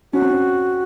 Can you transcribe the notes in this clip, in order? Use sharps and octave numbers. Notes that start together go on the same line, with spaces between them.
C#4 F#4
C4
C#4